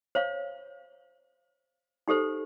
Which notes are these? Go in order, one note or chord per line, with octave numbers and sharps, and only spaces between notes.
C5 C#5 F5
D#4 G4 A4 C5